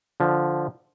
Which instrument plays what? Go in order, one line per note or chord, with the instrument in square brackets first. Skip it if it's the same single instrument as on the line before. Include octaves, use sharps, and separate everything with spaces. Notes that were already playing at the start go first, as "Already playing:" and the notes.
[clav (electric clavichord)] D3 F3